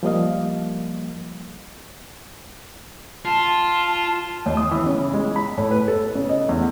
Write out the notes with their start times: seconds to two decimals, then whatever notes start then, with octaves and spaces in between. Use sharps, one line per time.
0.03 F3 G3 A#3 D#5 F5
3.25 F4 A5
4.46 D#2
4.57 D#6
4.71 E3
4.86 C#3
5.14 G#3
5.36 B5
5.58 A2
5.71 B4
5.88 A4
6.15 C#3
6.29 D#5
6.49 E2